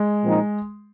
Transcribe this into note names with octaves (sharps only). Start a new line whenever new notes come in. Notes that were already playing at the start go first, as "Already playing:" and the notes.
Already playing: G#3
A#2 F3 C4 D#4